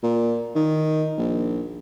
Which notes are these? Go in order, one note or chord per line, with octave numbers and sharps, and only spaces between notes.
A#2
D#3
A#1